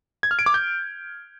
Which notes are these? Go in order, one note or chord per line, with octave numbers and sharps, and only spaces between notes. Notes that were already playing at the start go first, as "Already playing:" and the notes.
G#6
F6
D7
D6
G6